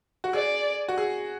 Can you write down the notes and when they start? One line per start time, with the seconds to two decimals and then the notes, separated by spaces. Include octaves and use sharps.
0.24 F#4
0.33 G#4 D5
0.89 F#4
0.98 G#4